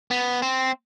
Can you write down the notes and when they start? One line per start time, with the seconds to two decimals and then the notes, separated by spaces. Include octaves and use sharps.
0.11 B3
0.42 C4